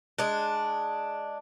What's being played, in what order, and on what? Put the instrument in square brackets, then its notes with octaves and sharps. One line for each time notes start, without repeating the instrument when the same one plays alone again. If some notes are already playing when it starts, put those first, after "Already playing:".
[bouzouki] G#3 D4